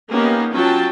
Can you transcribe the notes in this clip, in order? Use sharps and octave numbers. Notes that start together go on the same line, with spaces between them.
A#3 B3 C#4 D#4 G4
F#3 C#4 F4 G5 A5